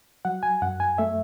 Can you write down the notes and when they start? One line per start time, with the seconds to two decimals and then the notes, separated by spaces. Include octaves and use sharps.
0.25 F#3 F#5
0.43 G#5
0.62 F#2 F#5
0.80 G#5
0.98 A3 E5